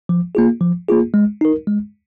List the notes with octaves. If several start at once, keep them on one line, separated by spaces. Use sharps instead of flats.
F3
A#3 F4 G#4
F3
A#3 F4 G#4
G#3
D#4 A#4
G#3